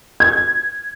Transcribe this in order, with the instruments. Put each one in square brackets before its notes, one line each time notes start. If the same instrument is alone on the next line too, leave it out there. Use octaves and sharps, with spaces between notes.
[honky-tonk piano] G#6